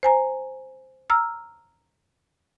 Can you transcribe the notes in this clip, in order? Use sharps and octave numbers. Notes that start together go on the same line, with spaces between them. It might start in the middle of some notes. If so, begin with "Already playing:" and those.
C5 G#5 A#5
A#5 E6 F6